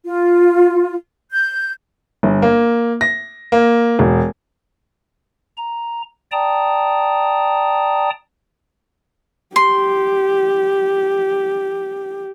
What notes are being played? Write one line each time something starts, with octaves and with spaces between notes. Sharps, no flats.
F4
G6
G1
A#3
A#6
A#3
E1
A#5
D5 G5 A5 A#5 D#6
G4 C6